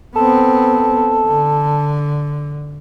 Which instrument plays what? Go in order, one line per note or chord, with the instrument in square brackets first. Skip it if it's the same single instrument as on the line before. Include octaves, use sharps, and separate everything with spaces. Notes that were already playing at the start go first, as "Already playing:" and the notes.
[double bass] B3 C4 [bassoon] A4
[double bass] D3